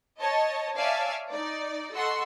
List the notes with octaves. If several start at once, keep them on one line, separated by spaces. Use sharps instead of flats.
C#5 D#5 A5
C#5 D5 E5 F5 G#5 A5
D#4 D5
A4 D#5 F#5 C6 C#6 E6